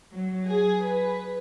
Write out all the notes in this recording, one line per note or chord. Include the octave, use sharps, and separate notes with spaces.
F#3
G#4
B4